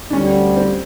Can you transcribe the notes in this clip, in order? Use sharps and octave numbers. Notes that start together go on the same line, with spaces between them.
D4
D2 D3 G3 C#4
C4